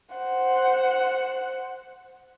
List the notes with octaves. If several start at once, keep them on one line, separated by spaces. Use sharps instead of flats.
C5 F#5